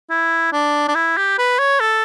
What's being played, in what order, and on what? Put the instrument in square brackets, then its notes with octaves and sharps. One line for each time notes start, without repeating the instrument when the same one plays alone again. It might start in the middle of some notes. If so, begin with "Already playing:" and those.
[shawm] E4
D4
D4
E4
G4
B4
C#5
A4